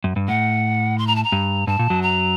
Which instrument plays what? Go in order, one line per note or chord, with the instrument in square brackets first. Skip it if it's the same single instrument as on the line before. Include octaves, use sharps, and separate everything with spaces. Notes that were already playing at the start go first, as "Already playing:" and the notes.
[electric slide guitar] F#2
G2
[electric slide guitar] A2 [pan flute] F#5
[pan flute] C6
A#5
A5
A#5
[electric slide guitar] G2
[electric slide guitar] G2 [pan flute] A5
[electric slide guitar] A#2
F#2 F#3
[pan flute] A#5